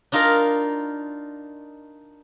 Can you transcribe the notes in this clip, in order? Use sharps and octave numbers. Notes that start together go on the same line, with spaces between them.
D4 D#4 F4 A#4 D#5 G#5